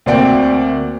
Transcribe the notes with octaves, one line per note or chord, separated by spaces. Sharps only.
D2 A#3 C4 D5 F#5 G5